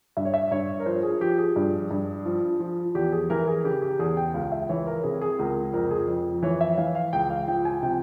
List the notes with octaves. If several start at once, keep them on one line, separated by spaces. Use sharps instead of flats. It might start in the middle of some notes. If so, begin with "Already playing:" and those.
G2 E5
C#5
E5
G2 C#5
A#4
F3 C5
G#4
F3 G4
G#4
G2
G2
F3
F3
E2 G4
G#4
E3 A#4
G#4
C#3 G4
G4
E2 G#4
G5
C#2 F5
E5
E3 C#5
A#4
C3 G#4
G#4
C#2 A#4
F2 A#4
G#4
F2
E3 C#5
E5
E3 F5
F5
C#2 G5
F5
F3 G5
G#5
C3 G5